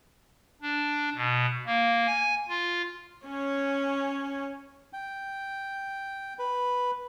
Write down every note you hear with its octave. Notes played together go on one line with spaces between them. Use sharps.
D4
B2
A#3
G#5
F4
C#4 C#5
G5
B4